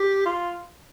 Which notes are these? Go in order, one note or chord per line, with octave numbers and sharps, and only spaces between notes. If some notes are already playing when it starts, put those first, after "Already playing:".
Already playing: G4
F4